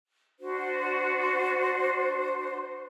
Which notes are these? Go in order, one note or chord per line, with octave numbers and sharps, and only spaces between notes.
D4 F#4 C5